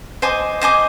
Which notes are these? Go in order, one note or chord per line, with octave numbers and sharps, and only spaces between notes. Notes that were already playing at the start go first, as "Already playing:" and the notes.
C5 D#5 G#5 D6
C5 D#5 G#5 D6